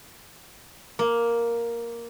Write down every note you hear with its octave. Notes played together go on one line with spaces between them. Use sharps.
A#3